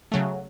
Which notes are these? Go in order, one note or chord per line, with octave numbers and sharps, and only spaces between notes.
C#3 F#3 A3